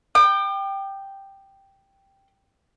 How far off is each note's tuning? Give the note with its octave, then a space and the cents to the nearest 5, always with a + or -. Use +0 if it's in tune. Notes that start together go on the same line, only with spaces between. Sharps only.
G5 +0 D6 +45